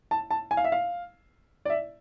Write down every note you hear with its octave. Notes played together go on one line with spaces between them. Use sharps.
A5
A5
G#5
F5
E5
F5
D5
E5